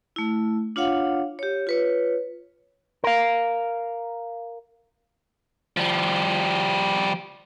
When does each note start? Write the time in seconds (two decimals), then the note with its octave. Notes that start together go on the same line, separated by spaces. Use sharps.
0.16 A3 E4
0.76 D4 F4 C#5 F5 F#5
1.39 G4 C#5
1.67 F4 B4 C#5
3.04 A#4 F5
5.77 F3 G3